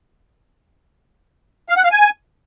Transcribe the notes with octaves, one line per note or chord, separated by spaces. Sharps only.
F5
F#5
F5
G#5